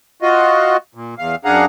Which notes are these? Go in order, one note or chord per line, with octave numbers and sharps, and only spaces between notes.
F4 F#4 D#5
A#2
E2 F5
F#2 D4 G#4 F5 F#5 A#5